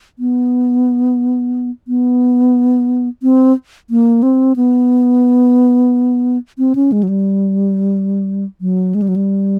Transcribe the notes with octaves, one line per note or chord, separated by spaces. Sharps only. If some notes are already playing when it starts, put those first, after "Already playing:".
B3
B3
C4
A#3
C4
B3
C4
C#4
G#3
F#3
G3
F#3
G#3
G3
F#3
G3